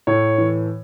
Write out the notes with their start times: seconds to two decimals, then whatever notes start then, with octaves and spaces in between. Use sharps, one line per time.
0.07 A2 C#5
0.38 E3